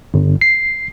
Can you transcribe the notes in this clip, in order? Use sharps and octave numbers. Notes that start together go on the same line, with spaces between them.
G1
C7